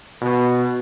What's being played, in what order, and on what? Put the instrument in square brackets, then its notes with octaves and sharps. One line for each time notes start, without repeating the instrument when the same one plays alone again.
[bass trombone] B2